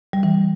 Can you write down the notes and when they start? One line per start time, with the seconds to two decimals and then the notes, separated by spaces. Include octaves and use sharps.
0.13 G3
0.23 E3